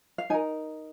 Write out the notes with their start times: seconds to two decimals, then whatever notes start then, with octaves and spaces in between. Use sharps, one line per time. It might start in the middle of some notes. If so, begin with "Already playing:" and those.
0.18 F5
0.30 D#4 G#5
0.34 A#4